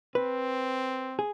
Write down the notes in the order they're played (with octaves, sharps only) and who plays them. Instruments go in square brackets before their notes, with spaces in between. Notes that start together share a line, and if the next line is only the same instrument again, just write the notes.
[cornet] C4 [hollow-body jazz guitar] B4
[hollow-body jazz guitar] G#4